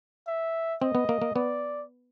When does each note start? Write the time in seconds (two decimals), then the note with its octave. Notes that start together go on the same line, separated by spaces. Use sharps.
0.27 E5
0.82 C4 D#5
0.95 B3
1.09 A#3
1.22 A#3
1.35 B3 D5